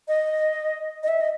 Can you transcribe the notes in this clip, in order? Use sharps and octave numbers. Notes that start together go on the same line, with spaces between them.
D#5
D#5
E5
D#5